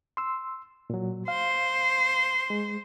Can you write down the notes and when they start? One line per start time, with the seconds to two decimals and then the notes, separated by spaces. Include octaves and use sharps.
0.17 C6 E6
0.90 A#2 F#3
1.28 C5 F5
2.50 G#3